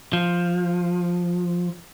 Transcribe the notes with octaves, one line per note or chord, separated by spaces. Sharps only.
F3